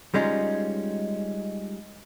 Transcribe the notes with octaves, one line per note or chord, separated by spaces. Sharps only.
G3 G#3 C#4 D#4 F4